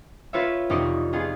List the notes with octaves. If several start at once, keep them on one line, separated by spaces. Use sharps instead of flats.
F4 B4 C#5 E5
F1 D#4 D5 D#5 C#6
B3 D#4 F4 G#4